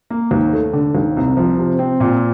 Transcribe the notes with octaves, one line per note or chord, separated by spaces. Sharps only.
A#3
D#2
A3
D3
D#2
C2
F3
C3
C4
A#2